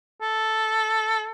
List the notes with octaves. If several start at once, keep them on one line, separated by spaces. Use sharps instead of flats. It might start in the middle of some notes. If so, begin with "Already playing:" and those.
A4